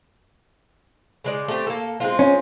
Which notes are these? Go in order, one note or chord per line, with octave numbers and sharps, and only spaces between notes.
C#3 G#3 D5
A3 C4 G4
A#3 A4
G#3 C4 F4
C#4